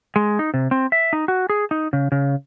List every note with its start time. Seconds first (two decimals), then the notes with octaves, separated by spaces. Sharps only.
0.16 G#3
0.39 D#4
0.54 C3
0.71 C4
0.92 E5
1.13 D#4
1.28 F#4
1.50 G#4
1.71 D#4
1.93 C#3
2.12 C#3